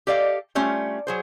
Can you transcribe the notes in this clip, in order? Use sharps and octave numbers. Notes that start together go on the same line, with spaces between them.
G4 A4 D5 D#5 F5
G3 A3 C#4 F4
F#3 G#4 C5